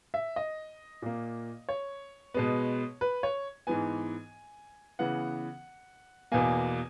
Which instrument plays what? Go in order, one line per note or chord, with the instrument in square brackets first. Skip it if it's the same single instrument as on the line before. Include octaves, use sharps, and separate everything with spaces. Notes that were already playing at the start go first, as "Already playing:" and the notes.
[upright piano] E5
D#5
A#2 A#3
C#5
B2 G#3 B3
B4
C#5
G#2 E3 B3 G#5
C#3 E3 B3 F#5
E2 B2 A#3 G#5